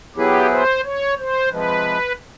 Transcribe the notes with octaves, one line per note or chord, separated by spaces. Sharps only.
F#3 B3 E4 G4 G#4 B4
C5
C#5
C5
C3 F3 G#3 B4